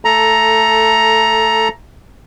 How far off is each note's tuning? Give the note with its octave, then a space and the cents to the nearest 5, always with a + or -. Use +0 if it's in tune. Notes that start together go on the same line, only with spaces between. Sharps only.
A3 +15 A4 +0 A#5 +10